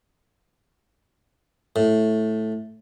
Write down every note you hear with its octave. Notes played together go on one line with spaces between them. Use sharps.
A2